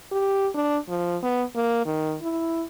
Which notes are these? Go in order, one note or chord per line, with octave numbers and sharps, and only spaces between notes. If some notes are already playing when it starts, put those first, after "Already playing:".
G4
D4
F3
B3
A#3
D#3
E4